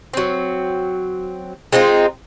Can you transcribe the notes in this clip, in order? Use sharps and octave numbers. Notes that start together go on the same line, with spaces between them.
F#3 C4
G#3 C4 D#4 F4